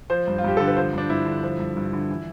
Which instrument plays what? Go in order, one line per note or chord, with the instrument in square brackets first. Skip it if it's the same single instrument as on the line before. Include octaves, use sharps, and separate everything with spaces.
[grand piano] F3 C5
G2
F4
G2 G4
D3 A4
B4
F3 C5
G2 D4
G2 E4
D3
F3
G2
G2
D3
E3